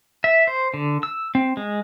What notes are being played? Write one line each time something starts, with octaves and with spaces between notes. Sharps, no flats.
E5
C5
D3
E6
C4
G#3